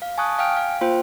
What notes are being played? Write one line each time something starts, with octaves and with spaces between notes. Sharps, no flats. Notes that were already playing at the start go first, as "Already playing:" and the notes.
F5
G#5 A5 C#6 D#6 F#6
F5 G5 G#5 F6 D7
F5
A#3 F4 C5 G5